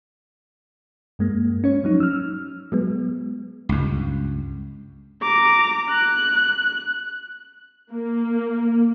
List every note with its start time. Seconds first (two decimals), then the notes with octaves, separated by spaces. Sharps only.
1.19 G2 G#3 A#3
1.64 C#4 C#5
1.84 F3 F#3 D#4
2.00 E6 F6
2.72 F#3 G#3 B3
3.69 C#2 G2
5.22 A#5 D6
5.90 F#6
7.92 A#3